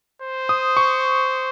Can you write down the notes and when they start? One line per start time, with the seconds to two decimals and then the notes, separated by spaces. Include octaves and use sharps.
0.22 C5
0.49 D#6
0.77 C#6